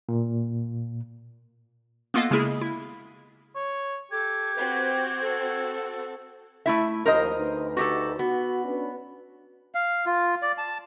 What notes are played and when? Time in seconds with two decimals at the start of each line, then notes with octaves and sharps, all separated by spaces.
0.09 A#2
2.14 A#3 B3 F4 A4 D#5 F5
2.31 C#3 G#3 A#3 E4 G#4
2.61 E4
3.56 C#5
4.12 G4 A4 G#6
4.55 C4 F#4 B4
5.21 A4
6.66 A3 E4 E5
7.06 D#2 F3 A#4 C5 D#5
7.36 D2 D#4 B4
7.77 F#4 G4 A4
8.19 B3 F#4
8.65 C#4 D4 B4
9.75 F5
10.06 F4
10.42 D5
10.58 A5